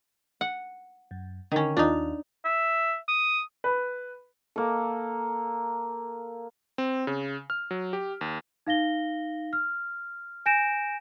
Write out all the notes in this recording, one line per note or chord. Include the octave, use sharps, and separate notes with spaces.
F#5
F#2
D3 D#3 C#4
D#2 D4 D#4 F4
E5
D#6
B4
A#3 A4
C4
C#3
F6
F#3
G4
D#2
D#4 F5 A#6 G7
F6
G#5 G6 A#6 D7 E7